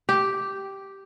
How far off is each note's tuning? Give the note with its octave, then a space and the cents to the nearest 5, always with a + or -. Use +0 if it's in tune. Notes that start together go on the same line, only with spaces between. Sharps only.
G4 -5